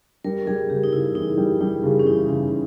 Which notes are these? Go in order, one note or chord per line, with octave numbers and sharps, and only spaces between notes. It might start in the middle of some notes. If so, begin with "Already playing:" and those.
G3 A#4
G3 G#4
C#3 G4
D#4
C#3 E4
E3 D#4
G3
G3 D#4
C#3
C#4
E3 D#4
C#3 C#4